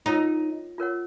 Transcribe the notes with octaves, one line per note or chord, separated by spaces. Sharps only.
D#4 F4 A#4 C#5 F#5
F4 A#4 C#5 F#5